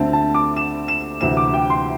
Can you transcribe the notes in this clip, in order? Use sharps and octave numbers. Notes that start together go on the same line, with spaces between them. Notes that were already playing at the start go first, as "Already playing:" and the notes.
Already playing: D2 D3 A3 C4 A5
A5
D6
E7
E7
D2 C3 E3 C4 E4 E7
D6
G5
C6